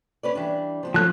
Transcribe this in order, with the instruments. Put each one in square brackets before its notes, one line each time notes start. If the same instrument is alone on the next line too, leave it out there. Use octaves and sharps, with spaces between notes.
[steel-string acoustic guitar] C#4 B4 D5
E3 G3 D4
F3 B3 C4
[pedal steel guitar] F3 F#6 [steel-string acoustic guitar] A3 C#4 A4